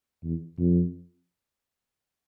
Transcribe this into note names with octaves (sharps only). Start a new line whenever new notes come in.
E2
F2